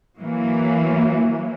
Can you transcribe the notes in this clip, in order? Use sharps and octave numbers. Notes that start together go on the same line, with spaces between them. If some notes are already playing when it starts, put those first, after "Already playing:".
E3 F#3 A#3